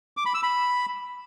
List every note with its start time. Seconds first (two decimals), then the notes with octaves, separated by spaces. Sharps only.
0.17 D6
0.26 B5
0.34 E6
0.43 B5